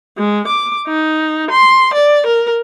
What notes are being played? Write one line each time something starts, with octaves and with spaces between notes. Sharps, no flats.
G#3
D6
D#4
C6
D5
A#4